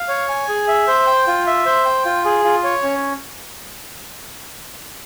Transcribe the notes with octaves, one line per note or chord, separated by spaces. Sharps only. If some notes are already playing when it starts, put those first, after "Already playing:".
Already playing: F5
C#5
G#5
G#4
E5
C5
G5
F4
E5
C5
G5
F4
G#4
F4
C#5
C#4